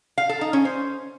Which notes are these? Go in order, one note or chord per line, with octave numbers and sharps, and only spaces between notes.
F5
A4
D#4
C#4
C5